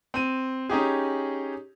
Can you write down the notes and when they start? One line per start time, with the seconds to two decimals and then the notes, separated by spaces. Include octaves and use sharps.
0.14 C4 D#7
0.69 C#4 D#4 G4 G#4